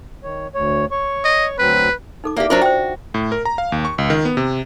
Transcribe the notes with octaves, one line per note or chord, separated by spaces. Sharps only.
D#3 C#5
D2 C#5
C#5 C#6
D#5
D2 F#3 C4 B4
D#4 A4 D6
A#3 E4 G4 D5 E5
F#3 D4 F4 A#4 C5
F#4 C5 G5
A2
A#4
A#5
F5
D#2
C#6
C#2
D#3
B3
C3